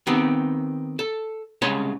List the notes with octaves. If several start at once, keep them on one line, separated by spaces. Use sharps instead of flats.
D#3 B3 C4 G4
A4
C2 C#3 G#3 C#5 A5 C6